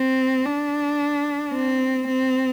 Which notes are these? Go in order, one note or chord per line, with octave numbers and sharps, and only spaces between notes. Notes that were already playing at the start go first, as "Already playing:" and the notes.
Already playing: C4
D4
C4
C4